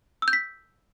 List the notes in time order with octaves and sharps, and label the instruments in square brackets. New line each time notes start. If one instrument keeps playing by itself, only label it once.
[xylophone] E6
G6
B6